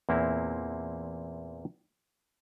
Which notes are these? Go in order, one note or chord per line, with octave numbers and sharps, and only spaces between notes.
E2 A#2 A#3 C4 E4